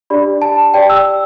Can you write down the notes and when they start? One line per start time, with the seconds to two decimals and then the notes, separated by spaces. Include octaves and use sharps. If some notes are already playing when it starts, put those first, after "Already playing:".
0.10 D4 G4 D5 B5
0.42 A5
0.74 G4 D5 G5
0.90 E6